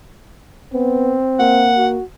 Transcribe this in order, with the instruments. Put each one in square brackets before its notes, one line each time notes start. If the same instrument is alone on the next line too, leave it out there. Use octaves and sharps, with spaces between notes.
[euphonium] B3 [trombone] C4
[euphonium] A#3 [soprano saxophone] F#5
[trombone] F#4